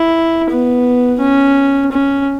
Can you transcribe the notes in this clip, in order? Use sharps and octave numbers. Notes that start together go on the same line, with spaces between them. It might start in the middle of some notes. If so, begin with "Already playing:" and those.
Already playing: E4
B3
C#4
C#4